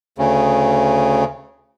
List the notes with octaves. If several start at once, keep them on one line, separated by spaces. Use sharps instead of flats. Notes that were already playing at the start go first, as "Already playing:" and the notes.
D2 C#3